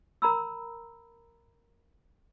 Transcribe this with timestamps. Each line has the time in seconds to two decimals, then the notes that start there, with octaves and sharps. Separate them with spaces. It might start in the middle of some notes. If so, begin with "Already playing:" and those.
0.22 A#4 A#5 B5 E6